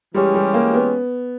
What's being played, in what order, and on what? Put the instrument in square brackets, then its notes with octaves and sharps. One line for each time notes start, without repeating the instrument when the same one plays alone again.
[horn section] E3 G#3 C#4 G4 [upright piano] G3
[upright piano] G3
A#3
B3